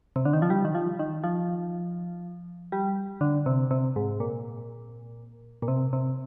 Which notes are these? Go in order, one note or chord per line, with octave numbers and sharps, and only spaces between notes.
C3
D3
D#3
F3
G3
D#3
F3
D#3
F3
G3
D3
C3
C3
G#2
A#2
A#2
C3
C3